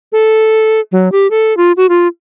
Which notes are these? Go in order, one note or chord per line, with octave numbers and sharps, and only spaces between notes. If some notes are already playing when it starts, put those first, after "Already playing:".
A4
F#3
G4
A4
F4
F#4
F4